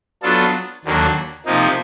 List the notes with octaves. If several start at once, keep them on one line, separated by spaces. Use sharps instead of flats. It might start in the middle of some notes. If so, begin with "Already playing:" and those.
F#3 B3 D4 F4 A4
D#2 D3 F#3 A#3 D4
C3 F3 A#3 D#4